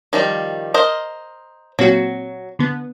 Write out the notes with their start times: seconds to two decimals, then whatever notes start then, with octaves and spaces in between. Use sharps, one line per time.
0.13 D#3 F3 G3
0.74 A#4 C5 D#5
1.79 A#2 F#3 C4 F#4
2.59 D3 B3